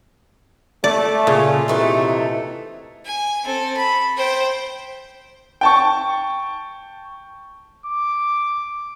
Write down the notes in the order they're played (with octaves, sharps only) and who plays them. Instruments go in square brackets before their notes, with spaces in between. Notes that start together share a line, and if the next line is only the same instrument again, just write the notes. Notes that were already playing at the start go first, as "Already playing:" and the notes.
[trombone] A3 [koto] D5
[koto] A#2 [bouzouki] C#3 C#4 F4
[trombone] C3 [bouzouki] E3 A3 D#4
[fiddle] G#5
C4 A4
B5
C5 G5
[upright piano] G5 A5 C#6
[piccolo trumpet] D6